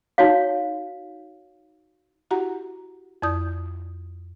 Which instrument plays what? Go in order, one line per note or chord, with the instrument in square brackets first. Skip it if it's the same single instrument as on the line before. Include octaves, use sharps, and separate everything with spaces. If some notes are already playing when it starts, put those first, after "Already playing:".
[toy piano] D#4 F#4 C#5 F5
[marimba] E4 F#4 G4 F#5 A#5
F2 E4 D5 D#6 G6